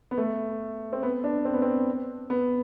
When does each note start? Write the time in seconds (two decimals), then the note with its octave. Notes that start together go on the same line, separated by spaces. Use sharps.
0.11 B3
0.18 A3
0.93 C4
1.03 B3
1.24 D4
1.45 C4
1.54 B3
1.62 C4
2.30 B3